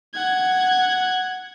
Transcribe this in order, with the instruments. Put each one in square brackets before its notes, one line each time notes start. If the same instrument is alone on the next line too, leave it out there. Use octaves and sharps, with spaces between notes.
[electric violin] F#5 G#6